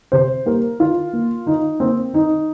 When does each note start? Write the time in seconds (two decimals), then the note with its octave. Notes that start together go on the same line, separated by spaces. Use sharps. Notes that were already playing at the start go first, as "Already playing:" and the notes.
0.12 C3 C5
0.45 G3 A#3 A#4
0.79 D#3 F4
1.13 A#3
1.46 D#3 D#4
1.80 A#3 C4
2.13 D#3 D#4